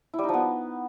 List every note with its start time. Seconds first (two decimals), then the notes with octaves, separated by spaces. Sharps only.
0.14 E4
0.19 G3
0.24 D#4
0.29 F3
0.34 B3